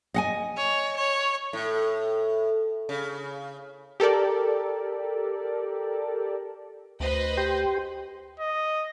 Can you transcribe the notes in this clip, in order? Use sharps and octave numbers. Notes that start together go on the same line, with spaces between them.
D#5 F#5 G#5
C#5
C#5
A2
C#3
G4 A4 A#4 D5
D2 B4 C5 D#5
G4 G5 C6
D#5